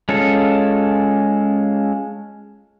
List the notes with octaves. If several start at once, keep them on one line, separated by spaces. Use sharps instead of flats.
G#3 C#4 F4 A4